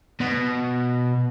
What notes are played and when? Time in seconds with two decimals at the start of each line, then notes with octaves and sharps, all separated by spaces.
0.20 B2